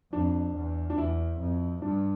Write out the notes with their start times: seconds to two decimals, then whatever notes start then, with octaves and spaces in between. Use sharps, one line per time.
0.12 F2 D4
0.55 E2
0.90 D4
0.98 E2 E4
1.39 F2
1.82 G2 D4